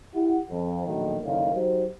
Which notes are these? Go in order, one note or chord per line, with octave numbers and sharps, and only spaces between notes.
E4 G4 F#5
F2
A#1 B2 D#3 F#3 A3 A#3
F#1 D2 D3 D#3 C#5 F5
F#3 D#4 F#4 G4 C5